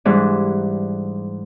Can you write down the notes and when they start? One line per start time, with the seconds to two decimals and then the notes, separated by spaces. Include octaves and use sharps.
0.05 G#2 E3 G3 D4